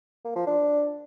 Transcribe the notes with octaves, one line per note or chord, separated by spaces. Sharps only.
A#3
F3
D4